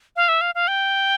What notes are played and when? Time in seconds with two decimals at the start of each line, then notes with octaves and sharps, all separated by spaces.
0.16 F5
0.29 E5
0.41 F5
0.55 F5
0.68 G5